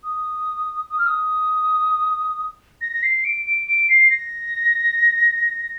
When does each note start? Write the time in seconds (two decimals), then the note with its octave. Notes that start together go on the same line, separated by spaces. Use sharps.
0.03 D#6
0.89 D#6
0.98 F6
1.06 D#6
2.81 A#6
2.92 A#6
3.03 C7
3.24 D7
3.45 D7
3.67 D7
3.89 C7
4.10 A#6